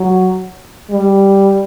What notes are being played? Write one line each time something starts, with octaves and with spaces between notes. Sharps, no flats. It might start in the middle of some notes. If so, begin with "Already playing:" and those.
Already playing: F#3
G3